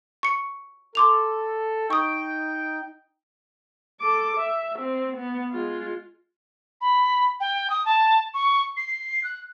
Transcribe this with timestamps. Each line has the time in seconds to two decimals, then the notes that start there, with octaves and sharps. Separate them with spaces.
0.23 C#6 C#7
0.95 A4 C6 D6 F7
1.90 D#4 G5 C#6 D#6
4.00 A4 D6
4.37 E5
4.79 C4
5.17 B3
5.51 G#3 F4
6.81 B5
7.40 G5
7.70 D#6
7.85 A5
8.34 C#6
8.77 C7
9.24 F#6